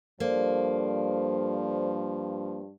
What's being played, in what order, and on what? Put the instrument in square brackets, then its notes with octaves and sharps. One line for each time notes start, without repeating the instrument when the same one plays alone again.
[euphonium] G2 [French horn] F3 [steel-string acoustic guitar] A#3 [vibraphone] A4 C5 D5